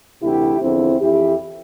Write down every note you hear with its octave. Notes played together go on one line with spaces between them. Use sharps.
D2 C3 E3 E4 G4
E2 D3 F3 C4 E4
F2 E3 E4 G4